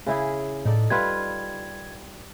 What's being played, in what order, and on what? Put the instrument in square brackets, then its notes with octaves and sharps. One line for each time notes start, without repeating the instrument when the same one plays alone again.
[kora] C#3 E4 G#4
[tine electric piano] A2 [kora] D#4 A4 D5
[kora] G3 F4 B4 [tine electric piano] G#6